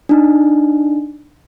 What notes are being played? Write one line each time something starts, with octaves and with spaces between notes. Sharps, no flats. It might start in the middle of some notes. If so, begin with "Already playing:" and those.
D4 D#4